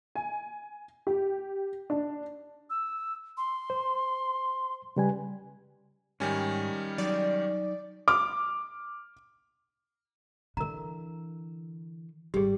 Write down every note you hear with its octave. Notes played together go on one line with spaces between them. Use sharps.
G#5
G4
D4
E6
C6
C5
C#3 G3 B4 G#5
G#2 D#3 G3 C#4 G#5
F#3 D#4 D5
D6 F6
D3 E3 A#4 A#5
G#1 G3 G4 G#4